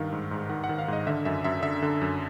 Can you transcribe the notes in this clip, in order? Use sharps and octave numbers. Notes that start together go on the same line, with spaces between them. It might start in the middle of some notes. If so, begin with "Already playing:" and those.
Already playing: G2 D#3 F5
G#2
G#2
D#3 F#5
F#5
D#3
F5
G#2 D#5
D3 E5
F#2 E5
F#2 E5
D3 E5
D3
F#2